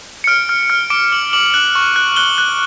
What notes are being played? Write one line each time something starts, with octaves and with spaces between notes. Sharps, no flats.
C#7
F6 D7
F6
F6
D6 D7
D6 F#7
D6 F#7
F#6 F#7
C#6
F#6
F#6 G7
F#6